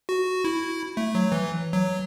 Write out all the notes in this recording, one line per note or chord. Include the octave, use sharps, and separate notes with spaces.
F#4
E4
A3
F#3
E3
F#3